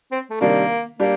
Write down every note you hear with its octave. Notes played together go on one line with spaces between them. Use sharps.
C4
A3
C3 D#3 G3 A#3 D4
G3 A#3 D4 G4